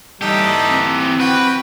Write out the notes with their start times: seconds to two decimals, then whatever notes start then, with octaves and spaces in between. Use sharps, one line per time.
0.21 E3 G3 D#4 G4 A4
0.69 C4
1.20 F#4 B4 G5